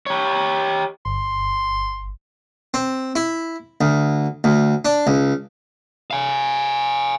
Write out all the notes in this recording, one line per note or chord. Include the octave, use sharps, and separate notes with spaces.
G4 C#5
G1 C6
C4
E4
D2
D2
D4
C#2
F5 G#5